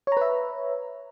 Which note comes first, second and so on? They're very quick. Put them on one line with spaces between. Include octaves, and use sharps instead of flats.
C#5 A#5 B4 E5